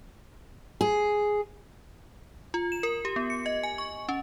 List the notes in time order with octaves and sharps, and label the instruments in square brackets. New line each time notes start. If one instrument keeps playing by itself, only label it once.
[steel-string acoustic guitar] G#4
[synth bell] F4
E7
A#4
G4
B3
C#7
D#5
G#5
C#6
C#4